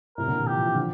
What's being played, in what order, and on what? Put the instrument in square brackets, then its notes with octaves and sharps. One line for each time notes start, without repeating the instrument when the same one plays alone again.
[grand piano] A2 C3 [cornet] A#4
[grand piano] A#2 D3
C3 E3
[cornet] G4
[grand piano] F3
E3
D3 F3